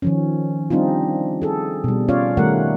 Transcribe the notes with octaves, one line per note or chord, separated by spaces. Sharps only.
D#3 F3 C#4
G3 C4 D4 D#4 F4
G#4 A4
B2 G3
C#4 F4 C#5 D5 F5
D#3 G3 A3 A#4 F#5